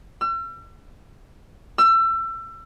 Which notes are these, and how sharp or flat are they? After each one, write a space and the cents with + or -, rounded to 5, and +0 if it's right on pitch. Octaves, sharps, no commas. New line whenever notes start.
E6 +45
E6 +30